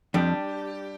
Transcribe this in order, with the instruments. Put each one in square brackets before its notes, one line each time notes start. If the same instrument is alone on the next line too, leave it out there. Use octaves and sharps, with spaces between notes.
[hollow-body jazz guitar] F2 [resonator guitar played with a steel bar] G3 D4 G4